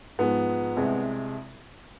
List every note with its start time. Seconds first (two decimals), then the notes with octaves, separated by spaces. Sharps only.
0.19 G#2 F3 G#3 B3
0.77 C2 C3 G#3